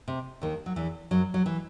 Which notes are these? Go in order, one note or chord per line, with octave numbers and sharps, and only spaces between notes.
C3
D#2 D#3
F#3
E2 E3
F#2 F#3
F#3
E3